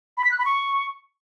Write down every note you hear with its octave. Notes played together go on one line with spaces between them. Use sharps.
B5
B6
F#6
B5
C#6